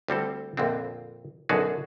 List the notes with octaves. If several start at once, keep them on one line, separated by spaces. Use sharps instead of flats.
D2 G3 C4 A4
A#1 F2 D3 C4
B1 F#2 D3 F#4 G#4 A5